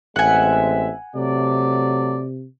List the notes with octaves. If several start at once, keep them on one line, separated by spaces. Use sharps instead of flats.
A1 G#3 C4 E5 F#5 G#5
C3 F#3 A3 D5